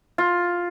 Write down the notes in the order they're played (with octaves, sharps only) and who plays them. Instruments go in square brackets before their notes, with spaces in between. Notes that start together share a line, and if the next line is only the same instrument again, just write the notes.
[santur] F4